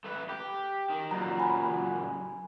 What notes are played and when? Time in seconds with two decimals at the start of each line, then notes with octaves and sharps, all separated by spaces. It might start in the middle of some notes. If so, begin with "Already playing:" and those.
0.04 A3 B4
0.29 G4
0.90 D#3
1.11 F#2 A#2 A#5
1.39 G#5 B5